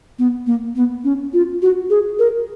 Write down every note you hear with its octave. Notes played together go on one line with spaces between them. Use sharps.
B3
A#3
B3
C#4
F4
F#4
G#4
A#4